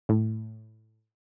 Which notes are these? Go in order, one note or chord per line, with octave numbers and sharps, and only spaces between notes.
A2